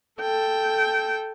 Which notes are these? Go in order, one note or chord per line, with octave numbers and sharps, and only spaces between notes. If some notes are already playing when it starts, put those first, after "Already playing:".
A4 G5